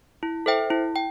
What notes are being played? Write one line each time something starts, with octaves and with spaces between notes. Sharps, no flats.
E4
A4 C5 E5 G5
E4
G5